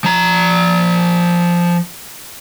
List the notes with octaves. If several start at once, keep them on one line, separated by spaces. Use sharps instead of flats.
F3 A#5